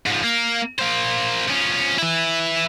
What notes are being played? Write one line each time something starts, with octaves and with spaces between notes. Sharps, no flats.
G#2 F3
A#3
A#3 C5
F3 C#4
E3 E4